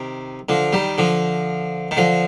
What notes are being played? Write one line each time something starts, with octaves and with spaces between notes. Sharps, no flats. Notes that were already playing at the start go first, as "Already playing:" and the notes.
Already playing: C3 D#3
D3 F3
D#3 G3
D3 F3
D#3
D3 F3